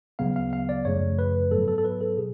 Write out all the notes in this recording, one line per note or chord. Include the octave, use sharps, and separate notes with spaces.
D2 C#3 F#3 B3 F5
F5
F5
D5
F#2 C#3 F3 A3 C#5
B4
G#2 F#3 B3 A4
A4
A4
B4
A4
B2 G#4